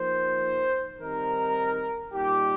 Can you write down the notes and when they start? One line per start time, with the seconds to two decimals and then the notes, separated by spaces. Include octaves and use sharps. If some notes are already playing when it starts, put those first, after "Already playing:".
Already playing: F3 A#3 D#4 C5
1.01 D#3 G3 C4 D#4 A#4
2.12 A#2 G3 D#4 G4